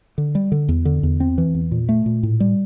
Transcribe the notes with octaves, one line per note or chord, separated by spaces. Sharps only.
D3
G3
D3
E2
D3
E2
C4
E3
E2
A#2
A3
A#2
A2
G3